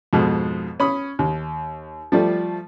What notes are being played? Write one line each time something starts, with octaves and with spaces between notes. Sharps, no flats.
F2 G#2 B2
C#4 B5 D#6
D#2
F3 G3 A3